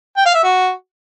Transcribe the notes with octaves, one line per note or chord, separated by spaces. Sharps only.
G5
F5
E5
F#4